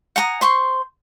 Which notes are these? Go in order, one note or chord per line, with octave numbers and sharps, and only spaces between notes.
F#5 G#5 A#5 D#6
C5 C6 C#6